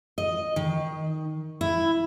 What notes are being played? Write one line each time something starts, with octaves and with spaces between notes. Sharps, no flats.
D#5
D#3
E4